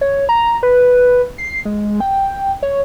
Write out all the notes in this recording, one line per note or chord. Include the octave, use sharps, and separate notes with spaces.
C#5
A#5
B4
C7
G#3
G5
C#5